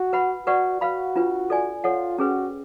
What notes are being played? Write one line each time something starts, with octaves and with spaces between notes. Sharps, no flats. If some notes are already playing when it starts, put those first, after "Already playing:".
Already playing: F#4
B4 F#5 B5
F#4 B4 D5 F#5 C#6
F#4 B4 F5 B5
D4 F4 B4
A4 D5 G#5
F4 A4 C#5 F#5
C#4 F#4 G#4 B4